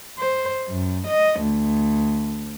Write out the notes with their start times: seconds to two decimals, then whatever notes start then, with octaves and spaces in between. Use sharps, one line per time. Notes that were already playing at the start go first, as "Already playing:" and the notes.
0.18 C5
0.69 F#2
1.07 D#5
1.42 D2